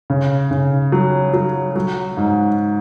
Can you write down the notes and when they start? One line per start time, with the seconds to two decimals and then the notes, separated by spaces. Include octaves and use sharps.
0.10 C#3
0.51 C#3
0.92 F#3
1.34 F#3
1.76 F#3
2.17 G#2